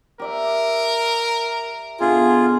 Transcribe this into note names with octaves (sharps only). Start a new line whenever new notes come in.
G4 A#4 D5 E5
B2 D3 F4 G#4